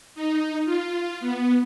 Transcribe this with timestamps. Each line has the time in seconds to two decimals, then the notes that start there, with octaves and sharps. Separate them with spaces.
0.15 D#4
0.65 F4
1.20 B3